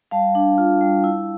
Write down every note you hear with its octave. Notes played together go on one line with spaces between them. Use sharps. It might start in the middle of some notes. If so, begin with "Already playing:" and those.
G3 F5 A5
D4
F4
G3
E4